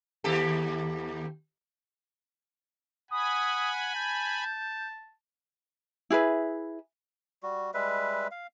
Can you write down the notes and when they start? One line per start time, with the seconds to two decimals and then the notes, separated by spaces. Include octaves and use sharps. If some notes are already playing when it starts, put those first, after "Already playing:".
0.24 D#2 G4 A4
3.11 F#5 G#5 B5 D#6
3.95 A5 G6
6.10 E4 G#4 B4 E5
7.43 G3 F#4
7.74 G3 G#3 B4 E5
8.31 F5